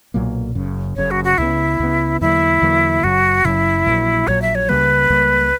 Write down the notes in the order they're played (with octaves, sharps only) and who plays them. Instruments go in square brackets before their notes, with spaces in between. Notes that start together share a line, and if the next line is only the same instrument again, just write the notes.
[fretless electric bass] B1 A#2 F#3 A#3
F#1 F#2 C#3
[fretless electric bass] F#1 F#2 C#3 [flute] C#5
[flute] F#4
F#4
[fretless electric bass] C#2 C#3 E3 B3 [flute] E4
[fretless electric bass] C#2 C#3 E3 B3
[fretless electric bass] E2 D3 F#3 A#3 [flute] E4
[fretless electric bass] E2 D3 F#3 A#3
[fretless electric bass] F#1 F#2 C#3 F#3 [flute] F#4
[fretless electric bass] F#1 F#2 C#3 F#3 [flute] E4
[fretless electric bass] A#1 A#2 F#3
[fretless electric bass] A#1 A#2 F#3 [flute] C#5
[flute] E5
C#5
[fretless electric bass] C#2 C#3 G3 A#3 [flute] B4
[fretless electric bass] C#2 C#3 G3 A#3